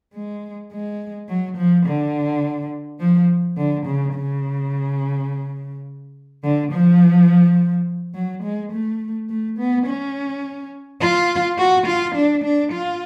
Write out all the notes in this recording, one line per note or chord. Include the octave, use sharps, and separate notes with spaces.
G#3
G#3
F#3
F3
D3
F3
D3
C#3
C#3
D3
F3
F#3
G#3
A3
A3
B3
C#4
F4
F#4
F4
D4
D4
F4